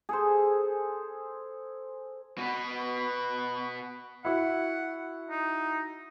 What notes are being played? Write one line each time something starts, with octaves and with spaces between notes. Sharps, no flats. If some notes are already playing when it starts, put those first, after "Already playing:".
G#4 A4 C5
B2 B3
E4 F#4 F#5
D#4